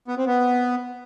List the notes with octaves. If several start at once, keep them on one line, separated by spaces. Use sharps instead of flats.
B3
C4
B3